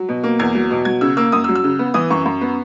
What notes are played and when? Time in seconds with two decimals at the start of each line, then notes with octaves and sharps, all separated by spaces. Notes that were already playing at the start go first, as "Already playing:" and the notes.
Already playing: F#3
0.09 B2
0.24 A#3
0.39 E2 G#6
0.55 F#3
0.71 B2
0.85 F#3 G#6
1.01 C#3 E6
1.17 A#3 E6
1.32 F#2 D#6
1.44 E6
1.49 F#3
1.55 E6
1.64 C#3
1.79 B3
1.94 E3 D#6
2.10 F#2 C#6
2.26 F#2
2.41 B3